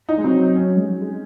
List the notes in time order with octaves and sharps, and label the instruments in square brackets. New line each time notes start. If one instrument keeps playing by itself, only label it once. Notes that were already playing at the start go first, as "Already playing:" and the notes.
[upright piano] D#4
[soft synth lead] G#3
[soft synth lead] F#3 [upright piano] C4
[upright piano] C#4
[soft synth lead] G#3
F#3
G#3